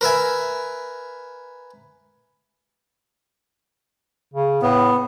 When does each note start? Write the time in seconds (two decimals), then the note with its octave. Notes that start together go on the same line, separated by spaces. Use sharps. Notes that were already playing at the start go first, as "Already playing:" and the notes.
0.01 A#4 B4 E5 G#5
4.34 C#3
4.62 A2 B3